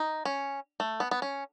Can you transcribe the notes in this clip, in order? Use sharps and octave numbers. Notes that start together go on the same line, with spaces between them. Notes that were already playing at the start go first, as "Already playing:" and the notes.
Already playing: D#4
C#4
A3
B3
B3
C#4